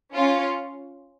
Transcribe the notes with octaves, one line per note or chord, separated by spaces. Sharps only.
C#4 F4